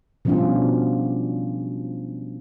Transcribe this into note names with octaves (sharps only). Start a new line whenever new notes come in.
B2 F3 G3 C#4 D4 F4